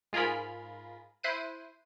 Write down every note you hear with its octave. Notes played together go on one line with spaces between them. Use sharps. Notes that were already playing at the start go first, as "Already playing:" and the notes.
G#2 F4 G#4 A#4 B5
E4 C5 F#6 D#7